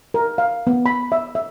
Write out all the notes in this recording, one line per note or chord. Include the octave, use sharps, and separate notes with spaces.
A#4
F5
B3
B5
E5
E5